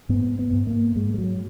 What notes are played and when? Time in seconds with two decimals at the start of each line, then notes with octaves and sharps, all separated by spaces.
0.09 G#2 B3
0.39 B3
0.53 G#2
0.67 A#3
0.95 G#2 G#3
1.14 G#3
1.18 F#3